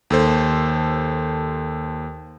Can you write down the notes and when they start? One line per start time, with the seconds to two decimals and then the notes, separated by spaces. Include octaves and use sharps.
0.10 D#2 A4 C5